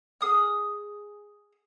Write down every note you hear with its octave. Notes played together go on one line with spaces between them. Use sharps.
G#4 D#6 F6